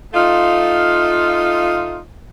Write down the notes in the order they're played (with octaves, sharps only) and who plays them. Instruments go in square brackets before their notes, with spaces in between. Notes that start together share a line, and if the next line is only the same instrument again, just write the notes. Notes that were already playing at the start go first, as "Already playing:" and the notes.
[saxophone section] A3 D#4 F4